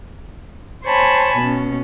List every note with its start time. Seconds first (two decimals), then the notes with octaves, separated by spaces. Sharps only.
0.85 C5 C#5 G#5 A5 B5
1.38 B2 C#4